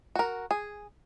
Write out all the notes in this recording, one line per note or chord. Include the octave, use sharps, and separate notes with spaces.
F#4 A#4
G#4